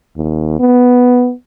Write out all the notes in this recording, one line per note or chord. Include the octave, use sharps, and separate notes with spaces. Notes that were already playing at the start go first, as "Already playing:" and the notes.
D#2
B3